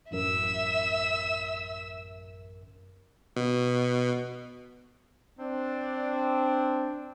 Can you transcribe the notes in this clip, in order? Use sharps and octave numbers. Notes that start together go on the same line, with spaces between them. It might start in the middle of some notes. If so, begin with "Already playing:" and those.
A1 F#2 A#4 E5 E6
B2
C4 D4